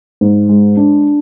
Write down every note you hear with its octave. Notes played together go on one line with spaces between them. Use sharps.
G#2
G#3
D4